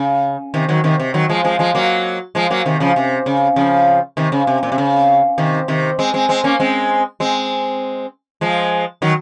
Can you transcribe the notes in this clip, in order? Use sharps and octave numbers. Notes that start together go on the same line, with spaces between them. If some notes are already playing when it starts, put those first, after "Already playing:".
Already playing: C#3
C3 D#3
D#3 F#3
C3 D#3
C3
D#3 F#3
F3 G#3
F3 G#3
F3 G#3
F#3 A#3
F3 G#3
F#3 A#3
C3 D#3
C#3 F3
C3
C#3
C#3 F3
C3 D#3
C#3
C3
A#2
C3
C#3
C3 D#3
C3 D#3
G#3 C4
G#3 C4
G#3 C4
A#3 C#4
G#3 C4
G#3 C4
F3 G#3
D#3 F#3